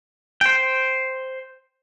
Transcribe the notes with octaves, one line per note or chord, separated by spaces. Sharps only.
C5 G5